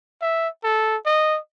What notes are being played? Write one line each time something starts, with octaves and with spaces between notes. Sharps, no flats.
E5
A4
D#5